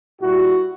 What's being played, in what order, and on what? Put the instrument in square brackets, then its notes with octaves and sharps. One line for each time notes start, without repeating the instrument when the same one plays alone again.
[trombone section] A#2 G3 E4 F#4